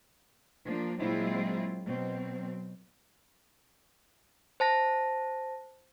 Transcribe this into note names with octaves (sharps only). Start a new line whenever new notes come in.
F3 A#3 D4
A#2 F#3 G#3 C4 E4 F4
B2 F#3 C4
C5 A5 A#6